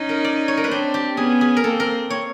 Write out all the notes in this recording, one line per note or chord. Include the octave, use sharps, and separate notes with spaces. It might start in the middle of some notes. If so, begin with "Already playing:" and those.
Already playing: C#4 D#4
A#4
D5
C#5
A#4
B4
C4 D4 C5
G4
B3 C#4 G#4
G#4
A#4
A#3 C4 A4
A#4
C#5